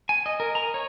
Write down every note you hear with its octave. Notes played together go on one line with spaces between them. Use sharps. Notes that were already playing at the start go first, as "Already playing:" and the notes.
G#5
D#5
A#4
A#5
C#5